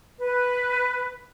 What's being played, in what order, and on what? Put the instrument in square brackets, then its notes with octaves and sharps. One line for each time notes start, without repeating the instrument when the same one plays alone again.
[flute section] B4